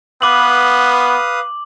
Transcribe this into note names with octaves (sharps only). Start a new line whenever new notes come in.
B3 B4 F5 D6 D#6 F#7